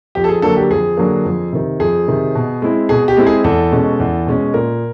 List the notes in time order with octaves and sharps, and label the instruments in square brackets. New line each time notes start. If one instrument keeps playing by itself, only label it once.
[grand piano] F2 G4
A4
G#4
D3 F#3 A#3 A4
G4
F2 G#4
D3 F#3 A#3
F2
C3 D#3
F2 G#4
C3 D#3
B2
G#3 C4 E4
B2 G#4
G4
G#3 C4 E4
G#4
E2 A4
B2 G#3 C#4
E2
B2 G#3 C#4
A#2 A#4